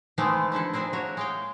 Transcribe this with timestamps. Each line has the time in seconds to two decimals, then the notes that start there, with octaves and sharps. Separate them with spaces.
0.18 D#3 E3 G#3 A3 B3 C4
0.52 F3 D4 E4 A4
0.74 A#3 C4 D4 G#4
0.93 F#4 A#4 C#5 E5
1.17 G#3 F5 G5